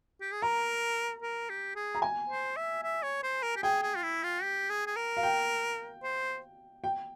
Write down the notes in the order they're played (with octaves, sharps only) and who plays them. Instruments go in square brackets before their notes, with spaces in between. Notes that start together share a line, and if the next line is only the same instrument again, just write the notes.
[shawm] G4
G#4
[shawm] A#4 [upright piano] A#5
[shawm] A#4
G4
G#4
[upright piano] A#5
G#5
[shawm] C5
E5
E5
C#5
C5
A#4
G4
[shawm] G#4 [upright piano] G5
[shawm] G#4
F4
E4
F4
G4
G#4
G#4
A#4
[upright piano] F5
G5
[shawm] C5
[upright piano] G5